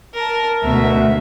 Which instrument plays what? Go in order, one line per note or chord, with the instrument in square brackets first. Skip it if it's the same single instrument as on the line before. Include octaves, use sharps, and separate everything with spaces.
[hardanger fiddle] A#4 A5
[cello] D2 B2 [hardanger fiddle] E5